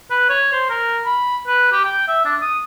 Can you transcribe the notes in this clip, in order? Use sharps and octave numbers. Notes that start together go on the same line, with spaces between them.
B4
C#5
C5
A#4
B5
B4
G4
G5
E5
D4
D#6